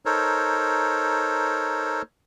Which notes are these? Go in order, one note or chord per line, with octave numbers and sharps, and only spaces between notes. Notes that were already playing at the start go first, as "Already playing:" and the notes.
D#4 A4 A#4 C5 C#5